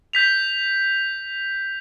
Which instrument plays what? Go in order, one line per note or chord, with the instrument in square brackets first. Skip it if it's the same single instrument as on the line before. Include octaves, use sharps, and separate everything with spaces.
[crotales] G6 B6 F7